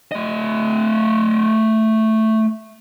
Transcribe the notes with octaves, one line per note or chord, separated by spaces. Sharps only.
A3 D#5